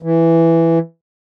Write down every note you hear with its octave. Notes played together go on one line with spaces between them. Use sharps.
E3